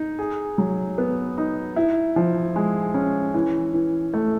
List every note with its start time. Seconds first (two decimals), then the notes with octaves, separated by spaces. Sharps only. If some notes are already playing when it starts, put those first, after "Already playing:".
Already playing: D#4
0.19 G#4
0.58 F#3
0.98 B3
1.38 D#4
1.76 E4
2.16 F3
2.56 G#3
2.94 C#4
3.34 E3
3.73 E3
4.14 A3